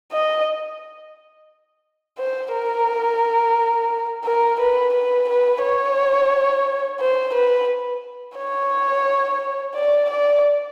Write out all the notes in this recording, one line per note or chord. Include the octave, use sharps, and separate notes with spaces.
D#5
C5
A#4
A#4
B4
B4
B4
C#5
C5
B4
C#5
D5
D5